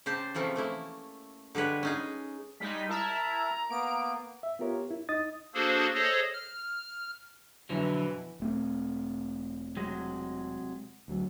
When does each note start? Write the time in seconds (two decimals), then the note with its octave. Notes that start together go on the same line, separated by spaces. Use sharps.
0.06 C#3 G4 C5 A5
0.34 C3 E3 F3 A3 C#4
0.56 A3 A#3 E4
1.55 D3 G3 G#3 B4 C#5
1.83 C#4 D#4 G#4
2.60 G3 G#3 D#4 B6
2.89 E4 A#4 E5 A5 A#5
3.70 A#3 B3 D7
4.43 E5
4.59 B3 F4 G4 A#4 C#5
4.91 E4
5.09 D#4 D#5 D#6 A6
5.54 A#3 D4 F#4 G#4 A4 C5
5.94 G#4 A4 C5 C#5 D#5
6.34 F6
7.69 F2 B2 D3 E3 F#3
8.40 E1 A3 C4
9.77 C3 F#3 G#3
11.08 D2 F#3